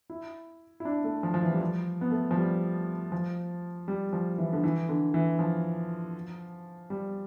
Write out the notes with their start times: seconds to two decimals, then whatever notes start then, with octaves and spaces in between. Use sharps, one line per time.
0.10 E4
0.80 E4
0.85 D4
1.04 A3
1.23 F3
1.34 F3
1.43 E3
1.53 G3
1.61 F3
2.01 B3
2.11 A3
2.31 F3
2.37 G3
3.12 F3
3.88 G3
4.13 F3
4.38 E3
4.53 D3
4.64 E3
4.89 D3
5.14 E3
5.39 F3
6.90 G3